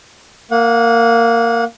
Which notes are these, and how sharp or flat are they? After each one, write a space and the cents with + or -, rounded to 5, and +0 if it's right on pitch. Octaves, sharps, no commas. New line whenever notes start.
A#3 -15 F#5 -35